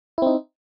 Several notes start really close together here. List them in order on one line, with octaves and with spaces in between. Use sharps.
E4 C4 D#4